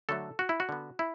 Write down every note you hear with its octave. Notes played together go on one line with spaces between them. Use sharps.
D3 F#3 A3 A4
F#4
E4
F#4
D3 B3
E4